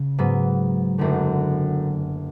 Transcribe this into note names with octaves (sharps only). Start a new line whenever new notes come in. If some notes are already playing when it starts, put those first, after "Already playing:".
Already playing: C#3
G#2 F#3 B3
F#1 F#2 D3 A3